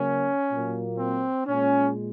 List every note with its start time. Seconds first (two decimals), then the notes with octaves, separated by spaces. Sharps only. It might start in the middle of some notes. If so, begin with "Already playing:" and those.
Already playing: C#3 F#3 A#3 C#4
0.50 A#2 F#3 A#3
0.99 C4
1.47 A#2 G#3 C#4